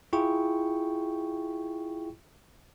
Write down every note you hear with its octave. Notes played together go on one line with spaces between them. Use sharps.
E4 F4 G#4 G5 C#6